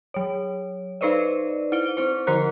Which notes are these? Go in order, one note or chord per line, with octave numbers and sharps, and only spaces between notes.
F#3 C#5
D#4 A4 B4 C5 D5 D#5
E4 C5 D7 G7
C4 E4 C5
D3 F3 A#4 C5 A#5 F#6